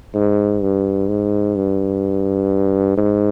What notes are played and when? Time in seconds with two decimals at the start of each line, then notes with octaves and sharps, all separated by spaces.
0.15 G#2
0.61 G2
1.09 G#2
1.56 G2
2.97 G#2